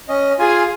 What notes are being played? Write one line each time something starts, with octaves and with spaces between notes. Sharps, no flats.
C#4 D#5
F4 G#4 G#5